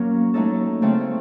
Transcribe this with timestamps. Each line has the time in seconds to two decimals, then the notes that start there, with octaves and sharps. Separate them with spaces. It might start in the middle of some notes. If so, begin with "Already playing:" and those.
Already playing: F#3 A#3 C#4 A#4
0.34 F#3 A3 D#4 A4
0.82 C#3 A3 C4